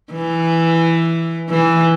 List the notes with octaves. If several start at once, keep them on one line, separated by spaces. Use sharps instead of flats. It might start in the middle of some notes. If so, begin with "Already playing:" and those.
E3
E3